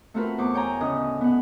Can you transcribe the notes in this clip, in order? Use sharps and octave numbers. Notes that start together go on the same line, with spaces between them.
A3 C4 F4 F#4 A#4 B4
E2 C5 C#6 D6
C#5 G5 G#5 A#5
D2 A2 C#3 C#4 D#5 G#5
B3 F#5